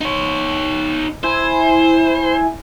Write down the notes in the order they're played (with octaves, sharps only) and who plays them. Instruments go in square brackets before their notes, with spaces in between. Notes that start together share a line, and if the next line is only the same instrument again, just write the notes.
[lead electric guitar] D#4 C#5
[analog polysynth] E4 G#5 [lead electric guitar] C5